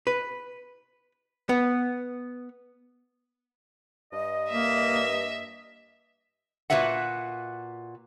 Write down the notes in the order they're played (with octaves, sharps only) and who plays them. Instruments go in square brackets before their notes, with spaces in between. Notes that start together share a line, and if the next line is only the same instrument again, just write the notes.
[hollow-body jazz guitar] B4
B3
[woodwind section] G2 D#5
[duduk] A#3 [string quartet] E5
[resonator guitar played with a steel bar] A#2 A3 F#4 B4 E5 F#5